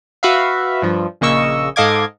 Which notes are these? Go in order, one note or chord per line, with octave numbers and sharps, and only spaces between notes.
F#4 B4 E5 F5
G2 F3
A#1 C#3 A#3 D#5 C#6 E6
G#2 A4 D#5 F5 D6 G#6